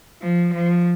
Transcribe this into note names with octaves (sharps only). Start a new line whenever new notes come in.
F3
F3